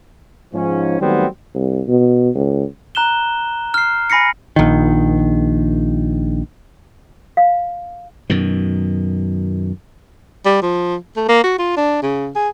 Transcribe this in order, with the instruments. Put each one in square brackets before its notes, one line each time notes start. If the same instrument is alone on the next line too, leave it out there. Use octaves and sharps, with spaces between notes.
[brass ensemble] G#2 F3 C#4
D#3 F#3 G3 A3 B3 C4
[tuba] C2
B2
C#2
[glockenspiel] A#5 F#6 E7 G7
F6 C7
G#5 B5 A#6 C7 C#7
[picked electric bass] A#1 D#3
[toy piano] F5
[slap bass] F#2 B2 D#3
[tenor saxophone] G3
F3
A3
A#3
F#4
F4
D4
C#3
G#4